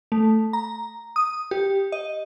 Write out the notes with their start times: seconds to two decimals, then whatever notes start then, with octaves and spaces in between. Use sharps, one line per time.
0.12 A3
0.53 A#5
1.16 D#6
1.51 G4
1.92 D#5